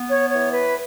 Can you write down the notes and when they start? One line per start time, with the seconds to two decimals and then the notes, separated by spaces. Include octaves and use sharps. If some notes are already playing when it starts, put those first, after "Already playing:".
Already playing: B3
0.11 C#5
0.31 E3 C#5
0.54 B4